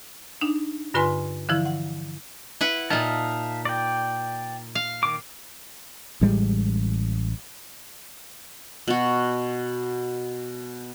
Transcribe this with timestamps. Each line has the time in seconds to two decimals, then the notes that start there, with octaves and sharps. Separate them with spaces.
0.41 D4 D#4
0.94 G2 D3 F4 B4 G#5 C6
1.49 D3 E3 F3 E4
1.65 F#5
2.61 E4 B4 F#5
2.90 A#2 D#4 E5 F5 A5
3.65 D5 G5
4.75 F5
5.03 D#3 D6
6.21 A1 A2 G3 G#3
8.88 B2 F#4